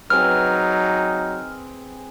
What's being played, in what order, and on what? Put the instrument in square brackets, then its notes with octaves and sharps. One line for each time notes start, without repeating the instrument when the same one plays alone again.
[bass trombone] F#3 [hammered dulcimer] C4 G#4 B4 [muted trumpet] D#4 [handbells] F6